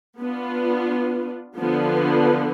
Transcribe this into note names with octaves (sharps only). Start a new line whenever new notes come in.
B3 D4 F4
D3 F3 B3